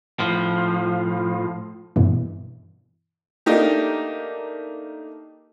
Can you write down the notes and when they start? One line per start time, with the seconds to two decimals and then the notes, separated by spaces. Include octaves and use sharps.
0.19 A2 F3
1.96 G2 B2 E3
3.46 A3 A#3 D4 D#4 G4